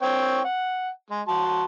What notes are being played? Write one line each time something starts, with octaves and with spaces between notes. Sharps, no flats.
C4 C#5 G5
F#5
G#3
F#4 A5 C6